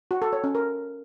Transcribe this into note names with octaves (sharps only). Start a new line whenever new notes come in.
F#4
A4
C#5
C#4
A#4